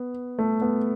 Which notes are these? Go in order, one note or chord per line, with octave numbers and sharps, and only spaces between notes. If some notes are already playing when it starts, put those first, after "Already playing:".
Already playing: B3
A3
B3